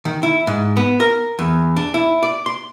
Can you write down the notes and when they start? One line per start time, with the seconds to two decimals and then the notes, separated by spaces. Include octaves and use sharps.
0.05 D#3
0.23 E4
0.47 G#2
0.77 B3
1.00 A#4
1.39 E2
1.76 D4
1.94 E4
2.23 D5
2.46 C6